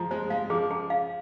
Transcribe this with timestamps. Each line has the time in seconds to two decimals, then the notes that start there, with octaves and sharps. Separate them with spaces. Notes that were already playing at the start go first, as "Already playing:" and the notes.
Already playing: F3 G#3 A#5
0.11 G#3 C5
0.30 G#3 F5
0.50 F3 G#4
0.71 G#4
0.90 F5